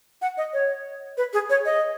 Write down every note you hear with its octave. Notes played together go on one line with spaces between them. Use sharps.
F#5
D#5
C#5
B4
G#4
C#5
D#5